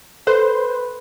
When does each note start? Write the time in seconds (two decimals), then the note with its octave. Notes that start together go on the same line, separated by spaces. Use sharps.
0.27 A4 B4 C5